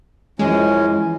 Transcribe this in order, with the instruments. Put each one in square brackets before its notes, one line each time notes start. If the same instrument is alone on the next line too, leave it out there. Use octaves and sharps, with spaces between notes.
[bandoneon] F#2 C#4 [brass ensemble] E3 F3 [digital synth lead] G#3